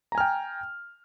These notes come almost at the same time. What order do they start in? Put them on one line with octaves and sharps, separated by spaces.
A#5 G#5 F6 G5